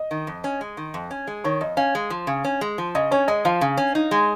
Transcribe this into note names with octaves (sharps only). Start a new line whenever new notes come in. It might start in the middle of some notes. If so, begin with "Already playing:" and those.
Already playing: D#5
D#3
F2
C#4
G#3
D#3
F2
C#4
G#3
D#3 C#5
F2 D#5
C#4 F5
G#3
F3
C#3
C#4
G#3
F3
C#3 D#5
C#4 C#5
G#3 D#5
F3 F5
C#3
C#4
D#4
G#3